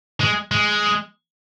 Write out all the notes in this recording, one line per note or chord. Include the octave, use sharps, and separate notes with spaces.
G#3
G#3